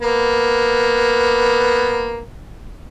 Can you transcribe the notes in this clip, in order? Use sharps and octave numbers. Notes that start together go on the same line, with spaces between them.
A#3 B3